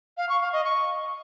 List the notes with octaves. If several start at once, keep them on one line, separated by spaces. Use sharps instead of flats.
F5
C#6
F5
D#5
C#6